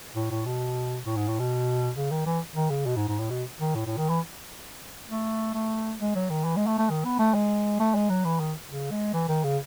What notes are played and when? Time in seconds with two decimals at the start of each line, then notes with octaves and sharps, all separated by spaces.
0.16 A2
0.30 A2
0.46 B2
1.06 A2
1.17 G#2
1.28 A2
1.39 B2
1.96 C#3
2.11 D#3
2.26 E3
2.55 D#3
2.70 C#3
2.86 B2
2.96 G#2
3.08 G#2
3.19 A2
3.30 B2
3.60 D#3
3.75 A2
3.86 A2
3.97 D#3
4.09 E3
5.10 A3
5.54 A3
6.00 G#3
6.15 F#3
6.30 D#3
6.44 E3
6.56 G#3
6.67 A3
6.79 A3
6.90 D#3
7.05 B3
7.19 A3
7.34 G#3
7.79 A3
7.95 G#3
8.10 F#3
8.24 E3
8.40 D#3
8.69 C#3
8.91 G#3
9.14 E3
9.29 D#3
9.44 C#3